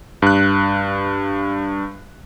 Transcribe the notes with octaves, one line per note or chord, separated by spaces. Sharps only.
G2 F#6